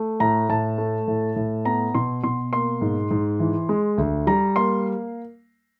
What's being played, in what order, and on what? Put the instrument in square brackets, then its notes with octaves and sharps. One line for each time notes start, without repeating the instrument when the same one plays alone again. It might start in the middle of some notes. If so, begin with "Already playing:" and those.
Already playing: [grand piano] A3
A2 A#5
A2 A5
A3
A2
A2
B3 A#5
B2 C6
B2 C6
A#3 C6
G#2
G#2
E3
G#3
D2
G3 A#5
A#3 C6